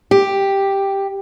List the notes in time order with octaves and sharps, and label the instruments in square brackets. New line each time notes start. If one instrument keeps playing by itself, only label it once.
[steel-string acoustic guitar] G4